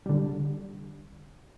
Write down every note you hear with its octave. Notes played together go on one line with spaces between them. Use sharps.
D3 G3